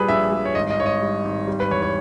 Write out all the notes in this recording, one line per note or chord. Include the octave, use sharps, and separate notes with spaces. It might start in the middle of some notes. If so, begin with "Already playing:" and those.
Already playing: A#2 G3 G#4 B4
A#1 E5
G3
C#5
G#1 D#5
D#5
G#1 C#5
D#5
G3
G#1
G3
B4
E2 C#5
C#5